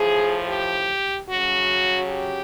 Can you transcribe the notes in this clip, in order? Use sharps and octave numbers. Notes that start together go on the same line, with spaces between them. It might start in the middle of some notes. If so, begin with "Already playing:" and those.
Already playing: A2 F3 G#4
G4
C#3 F#3 F#4
G4